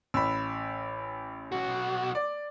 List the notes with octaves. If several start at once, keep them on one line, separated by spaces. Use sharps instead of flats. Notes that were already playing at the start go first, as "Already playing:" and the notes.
A1 B5 E6
B1 F#4
D5